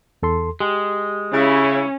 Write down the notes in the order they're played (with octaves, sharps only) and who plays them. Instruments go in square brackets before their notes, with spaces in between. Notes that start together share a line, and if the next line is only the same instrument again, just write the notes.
[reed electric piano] E2 A4 C6
[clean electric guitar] G#3 [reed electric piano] G4
[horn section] C#3 E4 [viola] C#4